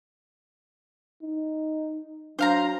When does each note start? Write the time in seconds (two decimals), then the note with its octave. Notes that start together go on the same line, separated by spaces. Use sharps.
1.23 D#4
2.39 F#3 D4 C5 F5 A#5